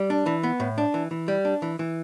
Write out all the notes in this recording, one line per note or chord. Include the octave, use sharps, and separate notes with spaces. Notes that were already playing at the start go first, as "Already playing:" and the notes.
Already playing: G3
D4
E3
B3
A2
D4
E3
E3
G3
D4
E3
E3